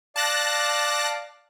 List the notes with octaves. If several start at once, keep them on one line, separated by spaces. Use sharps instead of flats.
D5 F5 A5 D6 F#6 A#6